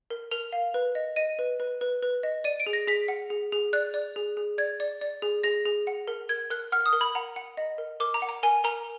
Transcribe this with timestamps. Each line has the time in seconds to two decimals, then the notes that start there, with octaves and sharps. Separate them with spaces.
0.10 A#4
0.31 A#4 F7
0.53 F5
0.74 B4
0.95 D#5
1.16 D#5 D#7
1.39 B4
1.60 B4
1.81 B4
2.03 B4
2.23 D#5
2.44 D5 D#7
2.60 D7
2.66 G#4
2.73 A#6
2.87 G#4 B6
3.08 F#5
3.30 G#4
3.52 G#4
3.73 D5 F#6
3.94 D5
4.16 G#4
4.37 G#4
4.58 D5 G#6
4.80 D5
5.01 D5
5.22 G#4
5.43 G#4 A#6
5.65 G#4
5.87 F#5
6.08 A#4
6.29 A#4 G#6
6.50 A#4 F#6
6.72 F#5 F6
6.86 D#6
6.93 A#4
7.01 B5
7.15 F#5 A#5
7.36 F#5
7.57 D#5
7.78 A#4
8.00 A#4 D6
8.14 A#5
8.22 F#5
8.29 A#5
8.43 A#4 G#5
8.64 A#4 A#5